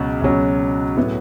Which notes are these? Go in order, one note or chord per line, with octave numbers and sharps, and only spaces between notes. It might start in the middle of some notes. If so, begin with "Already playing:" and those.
Already playing: C#2 B2 F#3 C#4
C#2 B2 F#3 C#4
A2 F#3 B3 E4